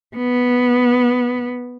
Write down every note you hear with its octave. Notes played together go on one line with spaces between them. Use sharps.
B3